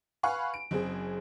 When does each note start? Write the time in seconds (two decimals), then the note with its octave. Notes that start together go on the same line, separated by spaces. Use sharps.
0.23 B4 F5 F#5 G#5 B5 C#6
0.54 D7
0.71 F#1 C4 G#4